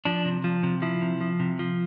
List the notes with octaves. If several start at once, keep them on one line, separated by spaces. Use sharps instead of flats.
F3 D4
C3
F3
C3
F3 E4
C3
F3
C3
F3